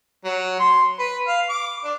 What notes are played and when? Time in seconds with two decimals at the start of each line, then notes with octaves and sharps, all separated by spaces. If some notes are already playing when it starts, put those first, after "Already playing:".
0.25 F#3
0.60 C6
0.99 B4
1.27 F5
1.49 D6
1.84 D4